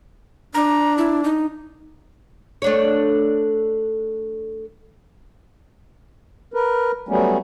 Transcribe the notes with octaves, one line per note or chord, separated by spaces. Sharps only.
D4 A#5
E4
D#4
A3 D4 C#5
A#4 B4
F#3 G3 A3 B3 C#4